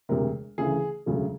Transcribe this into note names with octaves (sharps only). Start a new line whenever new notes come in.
E1 D2 C3 A#4
D2 C#3 E3 A3 G#4
E1 D2 C#3 F#3 A3